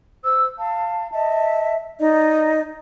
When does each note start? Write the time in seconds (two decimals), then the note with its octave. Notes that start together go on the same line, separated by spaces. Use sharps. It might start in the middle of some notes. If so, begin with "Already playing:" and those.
0.24 C5 E6
0.57 F5 A5
1.13 D#5 E5 A5
2.00 D#4 D5 D#5